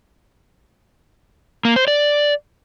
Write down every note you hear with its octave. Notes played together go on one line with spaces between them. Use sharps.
A#3
C5
D5